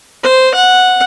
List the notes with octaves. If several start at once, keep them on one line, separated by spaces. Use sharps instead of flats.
C5
F#5